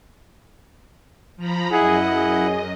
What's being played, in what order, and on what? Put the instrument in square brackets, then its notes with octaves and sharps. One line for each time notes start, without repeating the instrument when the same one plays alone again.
[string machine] F3 A#5 B5
[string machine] F#2 D#5 [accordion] E4 F#5 [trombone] G#4
[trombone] G#4